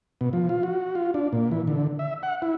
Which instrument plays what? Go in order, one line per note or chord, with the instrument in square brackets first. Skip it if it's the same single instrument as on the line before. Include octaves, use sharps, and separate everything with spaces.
[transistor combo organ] B2
F3
F4
F#4
F4
D4
A#2
E3
D3
E5
F#5
E4